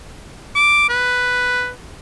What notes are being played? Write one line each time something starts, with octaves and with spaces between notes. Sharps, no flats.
D6
B4